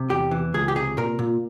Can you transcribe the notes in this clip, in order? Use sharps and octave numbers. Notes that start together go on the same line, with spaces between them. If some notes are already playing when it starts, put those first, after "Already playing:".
Already playing: C3
E2 G4
E3
C#2 G#4
G4
C3 G#4
A#2 A#4
A#2